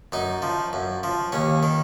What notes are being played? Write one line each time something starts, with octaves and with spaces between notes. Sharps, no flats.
F#2 D#4
F3
F#2
F3
D#2 C#4
D#3